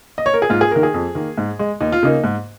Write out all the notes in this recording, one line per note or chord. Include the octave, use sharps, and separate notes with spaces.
D#5
C#5
A#4
G#4
G#2 F4
G#4
D#3 A#3 A#4
G#4
F2
D#3 A#3
G#2
G#3
D#2 D#4
F4
C#3 A#3 D#4
G#2